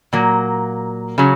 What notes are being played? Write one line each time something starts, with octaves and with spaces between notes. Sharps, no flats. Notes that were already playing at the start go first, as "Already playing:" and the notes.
A#2 F#3 A#3
C#3 F#3